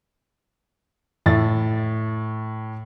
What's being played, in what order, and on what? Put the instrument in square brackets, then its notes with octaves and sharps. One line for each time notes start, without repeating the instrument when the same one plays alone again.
[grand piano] A2 E5 A6